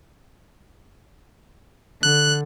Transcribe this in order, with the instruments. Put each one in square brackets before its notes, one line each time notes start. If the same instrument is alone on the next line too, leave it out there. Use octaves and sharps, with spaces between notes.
[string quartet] D3 [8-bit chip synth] F#6